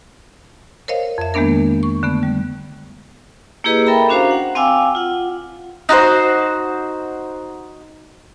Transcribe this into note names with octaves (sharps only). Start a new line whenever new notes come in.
A#4 C5 C#5 D#5 F5
F2 E5
D#3 G#3 A#3 B3 D4 A#4
C#6
D3 A3 B3
G3
A#3 E4 G4 G#4 B4 D#5
A4 A#4 E5 G5 A#5 B5
C#4 D4 F#4 C5 F5 A#5
F#5
C4 F5 G5 G#5 D6 E6
F4 F#5
D#4 F#4 A4 C5